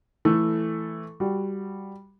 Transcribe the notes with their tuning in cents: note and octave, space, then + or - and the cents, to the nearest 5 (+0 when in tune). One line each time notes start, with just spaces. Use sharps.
E3 +0 A3 +0 A4 +0
G3 +0 F#4 +0